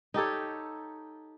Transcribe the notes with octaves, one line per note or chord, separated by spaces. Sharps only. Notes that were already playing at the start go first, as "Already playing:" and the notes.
D#4 G4 A4 C#5